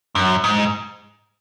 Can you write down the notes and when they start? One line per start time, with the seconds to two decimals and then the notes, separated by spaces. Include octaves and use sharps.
0.15 F#2
0.44 G#2